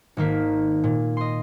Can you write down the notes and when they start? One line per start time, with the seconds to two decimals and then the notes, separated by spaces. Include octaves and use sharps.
0.17 G#1 D#3 A#3 B6
0.84 A#2
1.17 D#5 C6